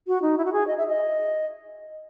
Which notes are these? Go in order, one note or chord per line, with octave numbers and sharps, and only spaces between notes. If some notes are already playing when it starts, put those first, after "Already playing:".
F#4
D#4
E4
F#4
G#4
D#5
E5
D#5